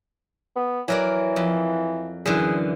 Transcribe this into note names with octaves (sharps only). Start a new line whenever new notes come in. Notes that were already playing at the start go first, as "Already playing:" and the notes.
B3
E3 F#3 A#4 D5
F2
F#2 D3 E3 G#4